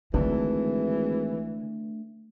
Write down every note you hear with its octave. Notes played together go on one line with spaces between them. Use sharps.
G#1 D3 E3 A3 D4